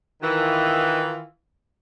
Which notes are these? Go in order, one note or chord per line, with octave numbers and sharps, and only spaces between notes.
D#3 E3 F4